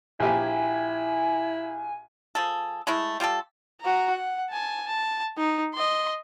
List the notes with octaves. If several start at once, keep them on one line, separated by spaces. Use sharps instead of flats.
A#1 E4 G4 G#5
F3 G#4 A4
G#3 A3 E4
G3 F4 G4 A4
F#4 A#5
F#5
G#5 A5
A5
D#4
D#5 C6